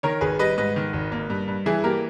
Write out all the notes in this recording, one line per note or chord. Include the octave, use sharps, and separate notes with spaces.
D#3 A#4 C#5
G#1 G#4 B4
G3 B4 D#5
G#2 B4 D#5
D#3
G#1
A#3
G2
G2
E3 E4 G#4
A#3 G4 A#4